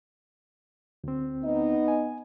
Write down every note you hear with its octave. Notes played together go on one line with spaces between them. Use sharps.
D2 C4
B3 D#4 D#5
G#5